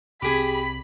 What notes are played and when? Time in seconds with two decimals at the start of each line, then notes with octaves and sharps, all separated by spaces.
0.22 C2 C4 G4 G#4 B5